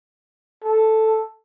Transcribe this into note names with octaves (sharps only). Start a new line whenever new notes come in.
A4